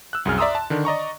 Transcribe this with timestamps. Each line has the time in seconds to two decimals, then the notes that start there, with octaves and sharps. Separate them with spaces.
0.13 E6 F#6
0.25 C2 F#2 G#4 F6
0.38 D5 E5 A#5 C6 D#6 E6
0.55 A5
0.70 D3 D#3 D4
0.85 D5 D#5 A#5 C#6